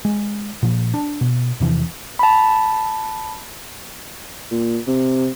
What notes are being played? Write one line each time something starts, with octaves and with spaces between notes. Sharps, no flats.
G#3
A#2 F3
D4
B2
E2 C3 E3 F3
A5 B5
A#2
C3